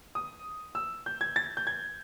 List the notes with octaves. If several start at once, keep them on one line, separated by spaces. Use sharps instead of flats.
D#6
E6
G6
G#6
A6
G6
G#6